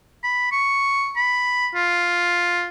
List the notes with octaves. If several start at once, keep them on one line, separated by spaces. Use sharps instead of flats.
B5
C#6
B5
F4